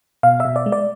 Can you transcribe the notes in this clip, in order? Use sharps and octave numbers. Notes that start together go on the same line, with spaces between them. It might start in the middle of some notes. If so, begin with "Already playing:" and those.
B2 F5
E5
B2
D5
G#3
D5